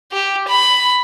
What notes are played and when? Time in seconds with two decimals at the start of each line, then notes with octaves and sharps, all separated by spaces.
0.12 G4
0.47 B5